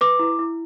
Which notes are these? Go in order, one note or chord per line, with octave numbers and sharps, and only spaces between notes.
B4 D6
E4
E4